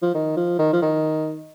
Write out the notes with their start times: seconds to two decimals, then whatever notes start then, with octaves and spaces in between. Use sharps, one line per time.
0.02 F3
0.15 D#3
0.37 F3
0.59 D#3
0.73 F3
0.82 D#3